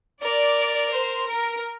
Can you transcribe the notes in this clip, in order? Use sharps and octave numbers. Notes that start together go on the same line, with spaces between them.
A#4 D5
C5
A#4